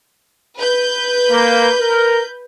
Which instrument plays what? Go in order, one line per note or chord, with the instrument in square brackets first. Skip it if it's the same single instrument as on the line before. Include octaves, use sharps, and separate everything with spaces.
[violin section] B4 G6
[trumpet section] A#3
A#4